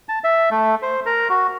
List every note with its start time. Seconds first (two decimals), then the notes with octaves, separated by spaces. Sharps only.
0.09 A5
0.24 E5
0.51 A3
0.82 C5
1.06 A#4
1.29 F#4